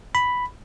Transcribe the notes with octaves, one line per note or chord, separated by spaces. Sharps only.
B5